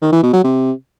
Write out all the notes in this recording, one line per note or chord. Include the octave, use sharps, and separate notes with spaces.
D#3
E3
B2
F#3
C3